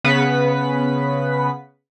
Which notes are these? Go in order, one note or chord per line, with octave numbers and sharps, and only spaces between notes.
C#3 B3 B4 F#5 B6